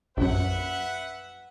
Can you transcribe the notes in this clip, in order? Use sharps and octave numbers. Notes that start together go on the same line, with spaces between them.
A#1 F#2 B4 E5 F#5